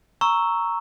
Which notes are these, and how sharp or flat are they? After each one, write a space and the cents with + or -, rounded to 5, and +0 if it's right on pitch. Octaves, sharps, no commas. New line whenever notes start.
A#5 +0 C#6 +0 E6 +0